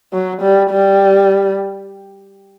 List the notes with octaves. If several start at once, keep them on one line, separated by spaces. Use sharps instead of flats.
F#3
G3
G3